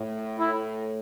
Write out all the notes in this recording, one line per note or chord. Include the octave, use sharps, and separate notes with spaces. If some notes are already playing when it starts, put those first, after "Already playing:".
Already playing: A2
E4